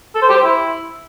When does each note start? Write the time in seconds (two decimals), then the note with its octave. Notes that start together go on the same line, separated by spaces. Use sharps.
0.15 A4
0.22 C5
0.29 G4
0.37 C5
0.44 E4